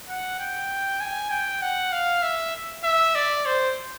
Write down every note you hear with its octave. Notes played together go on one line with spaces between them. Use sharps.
F#5
G5
G#5
G5
F#5
F5
E5
E5
D5
C5